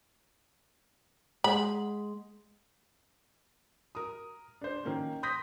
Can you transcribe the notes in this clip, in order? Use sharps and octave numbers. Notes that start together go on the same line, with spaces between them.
G#3 F#5 B5
A#4 D#6
D4 C5
D#3 A#3 C#4
C6 D#6 G6 A#6 B6